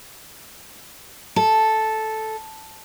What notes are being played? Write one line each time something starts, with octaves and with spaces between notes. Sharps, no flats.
A4